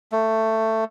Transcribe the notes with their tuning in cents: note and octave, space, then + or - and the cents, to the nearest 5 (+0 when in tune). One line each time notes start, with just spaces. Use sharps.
A3 +15